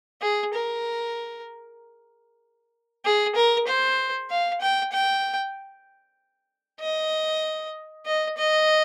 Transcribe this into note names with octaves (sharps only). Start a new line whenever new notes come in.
G#4
A#4
G#4
A#4
C5
F5
G5
G5
D#5
D#5
D#5